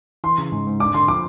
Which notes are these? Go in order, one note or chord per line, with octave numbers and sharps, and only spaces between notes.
E3 C6
C#3
G#2
G#2
D4 D6
D3 C6
F3 D6